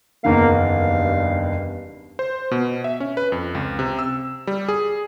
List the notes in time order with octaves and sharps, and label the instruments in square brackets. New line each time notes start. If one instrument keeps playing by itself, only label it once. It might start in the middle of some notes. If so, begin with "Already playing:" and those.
[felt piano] F#1 E2 D#3 [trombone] A#3 [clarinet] F5
[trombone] G2
[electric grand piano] C5
B2
E5
C#4
B4
F2
C#2
C3
E6
G3
G#4